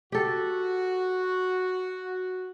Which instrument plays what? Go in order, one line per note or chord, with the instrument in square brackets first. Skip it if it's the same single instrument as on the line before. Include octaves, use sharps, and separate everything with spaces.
[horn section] F#4 [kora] G4 A4